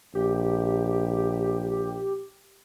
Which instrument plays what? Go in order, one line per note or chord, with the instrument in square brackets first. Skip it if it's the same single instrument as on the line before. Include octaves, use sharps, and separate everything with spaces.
[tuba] A#1 [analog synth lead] G4